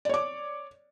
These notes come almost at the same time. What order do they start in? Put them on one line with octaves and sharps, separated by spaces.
D5 C#5 D6